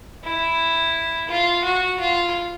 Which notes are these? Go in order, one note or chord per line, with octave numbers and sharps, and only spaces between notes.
E4
F4
F#4
F4